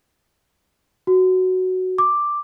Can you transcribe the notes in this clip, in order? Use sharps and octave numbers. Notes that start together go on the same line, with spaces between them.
F#4
D6